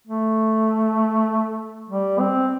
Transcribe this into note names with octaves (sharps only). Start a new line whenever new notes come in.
A3
G3
C4